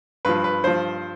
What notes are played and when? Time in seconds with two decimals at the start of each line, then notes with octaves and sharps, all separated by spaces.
0.25 G2 F3 B4
0.44 B4
0.63 G2 F3 C5